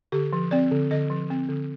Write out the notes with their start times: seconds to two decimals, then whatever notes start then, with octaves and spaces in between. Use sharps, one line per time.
0.12 D3 G4
0.33 F3
0.51 C4 D5
0.71 D3
0.91 D3 D#5
1.10 F3
1.30 C4
1.49 D3